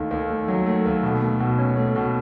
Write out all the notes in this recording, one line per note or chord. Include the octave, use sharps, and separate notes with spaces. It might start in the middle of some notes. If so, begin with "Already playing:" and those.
Already playing: D#2 D#3 A3
D#2
A3
F#3
A3
D#2
B2
A3
B2
C#4
A3
B2